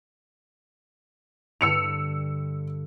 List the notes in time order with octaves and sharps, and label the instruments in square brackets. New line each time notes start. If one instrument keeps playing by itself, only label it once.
[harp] G2 D3 [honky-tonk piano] E6 C#7 F7